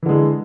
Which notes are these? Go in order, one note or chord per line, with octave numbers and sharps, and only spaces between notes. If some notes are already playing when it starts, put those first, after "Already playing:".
D3 E3 G#3